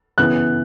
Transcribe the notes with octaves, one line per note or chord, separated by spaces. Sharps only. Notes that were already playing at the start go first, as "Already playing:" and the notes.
C#3 E3 B3 F#6